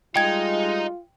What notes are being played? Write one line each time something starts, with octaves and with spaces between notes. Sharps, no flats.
G3 G#3 D#4 F4 G5 G#6